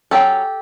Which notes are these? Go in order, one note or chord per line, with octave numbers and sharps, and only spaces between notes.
F#3 A3 C#4 G4 A4